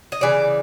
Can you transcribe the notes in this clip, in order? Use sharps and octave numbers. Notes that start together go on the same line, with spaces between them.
D#5
C#3 E3 D5